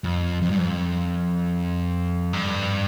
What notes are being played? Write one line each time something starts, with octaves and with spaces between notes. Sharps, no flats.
F2
F2
G2
F2
G2